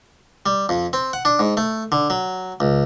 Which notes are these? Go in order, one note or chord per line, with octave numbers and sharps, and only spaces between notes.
G3
F2
C4
F#5
D4
G#2
A3
D3
F#3
C#2